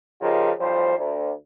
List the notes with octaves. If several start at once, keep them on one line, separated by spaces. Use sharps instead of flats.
C#3 F3 D#4 F4 G4 A#4
B1 F3 G3 C5
D2